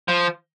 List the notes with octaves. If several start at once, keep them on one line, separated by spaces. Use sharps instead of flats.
F3